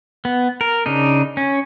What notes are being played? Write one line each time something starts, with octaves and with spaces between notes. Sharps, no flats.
B3
A#4
C#3 D4 D#4
C#4